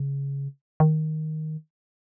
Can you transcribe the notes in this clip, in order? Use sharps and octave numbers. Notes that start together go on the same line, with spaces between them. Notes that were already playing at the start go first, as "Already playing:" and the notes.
Already playing: C#3
D#3